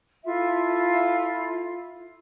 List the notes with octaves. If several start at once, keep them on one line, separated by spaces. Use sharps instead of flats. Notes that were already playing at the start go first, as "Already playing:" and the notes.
E4 F4 A4 E5